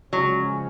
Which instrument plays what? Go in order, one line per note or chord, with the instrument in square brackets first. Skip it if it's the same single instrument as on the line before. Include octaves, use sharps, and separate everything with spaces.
[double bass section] C#3 F3 G#3 C#4 [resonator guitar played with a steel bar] F#3